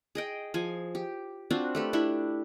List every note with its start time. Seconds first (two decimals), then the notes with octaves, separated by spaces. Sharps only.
0.15 G#4 D#5 G5
0.54 F3 G#4 G#5
0.95 G4
1.51 C4 D4 F4 F#4
1.75 A3 G4 B4
1.93 D4 E4 G4